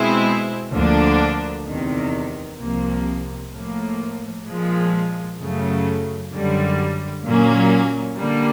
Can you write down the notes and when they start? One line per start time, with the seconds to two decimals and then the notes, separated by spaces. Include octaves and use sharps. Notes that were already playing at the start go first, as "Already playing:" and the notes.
Already playing: B2 G#3 C4 E4
0.72 D2 D3 F3 A#3 D4
1.65 E2 C3 D#3
2.58 C2 C3 F3 A#3
3.52 A2 F3 A#3
4.46 A#2 F3 G#3
5.39 F#2 C#3 F#3 A3
6.32 F#2 D3 G3
7.26 A#2 F#3 A#3 C#4
8.19 D3 G3 A#3